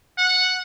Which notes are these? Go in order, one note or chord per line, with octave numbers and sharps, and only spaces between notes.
F#5